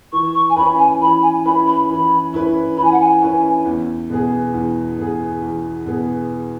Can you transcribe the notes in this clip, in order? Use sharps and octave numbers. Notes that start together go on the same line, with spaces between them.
E3 C#6
C#6
G#5
C#4 E4 B4 B5
G#5
E3 B5
G#5
C#4 E4 B4 B5
B5
E3 B5
C#4 E4 B4
E3 B5
G#5
F#5
G#5
C#4 E4 B4
E2
B2 B3 G#4
E2
B2 B3 G#4
E2
B2 B3 G#4